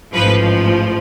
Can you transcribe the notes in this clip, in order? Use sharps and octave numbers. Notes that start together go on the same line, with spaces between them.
A1 G#2 F3 B4